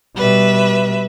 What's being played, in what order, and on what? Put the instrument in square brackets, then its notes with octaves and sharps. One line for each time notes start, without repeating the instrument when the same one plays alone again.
[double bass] B2 G3 [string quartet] B4 E5